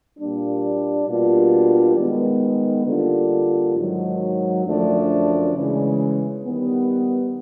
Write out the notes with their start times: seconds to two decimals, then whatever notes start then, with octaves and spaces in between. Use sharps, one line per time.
0.18 A#2 G3 A#3 D4
1.08 B2 G3 A#3 D4 F4
1.97 D#3 G#3 B3
2.86 D3 G3 A#3 D4 F4
3.75 G#2 D#3 F#3
4.65 F#2 D3 F3 A3 D4
5.54 C#3 E3 G#3
6.43 D#3 G3 B3